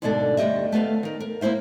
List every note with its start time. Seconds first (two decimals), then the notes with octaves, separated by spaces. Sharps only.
0.02 D2 G#2 B2 A#3 D4 A4
0.37 D2 G2 G4 D#5 E5
0.72 A3 B3 B4 F5
1.03 D#3 A#4
1.20 A#4
1.41 A#3 C#4 E4 C5 E5